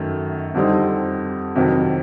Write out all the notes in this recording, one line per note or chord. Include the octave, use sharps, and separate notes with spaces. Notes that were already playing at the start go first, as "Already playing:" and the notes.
Already playing: F#2 D#3 F#3 A3
F2 D3 G3 C4 D#4
F2 C3 D#3 F#3